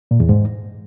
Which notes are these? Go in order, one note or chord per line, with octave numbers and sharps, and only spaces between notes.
A#2
E2
G#2